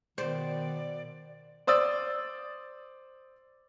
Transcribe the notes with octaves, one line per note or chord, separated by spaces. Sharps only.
B2 D#3 C5 D5
C5 D5 D#6 E6 A6